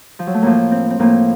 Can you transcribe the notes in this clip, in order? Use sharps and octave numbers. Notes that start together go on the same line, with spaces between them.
F3
F#3
A3
A2 F3 A#3
C4
C4
A2 F3 A#3